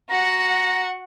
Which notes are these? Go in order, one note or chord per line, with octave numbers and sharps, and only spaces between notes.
F#4 F#5 A#5